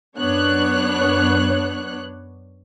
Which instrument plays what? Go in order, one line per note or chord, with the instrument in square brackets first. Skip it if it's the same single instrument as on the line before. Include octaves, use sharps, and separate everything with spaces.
[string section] F#2 B3 D4 C#5 F#6